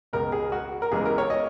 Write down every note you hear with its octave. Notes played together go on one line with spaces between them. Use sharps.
C#2 B2 G#3 A#4
G#4
F#4
A#4
E2 C#3 E3 G#3 G#4
A#4
C#5
D#5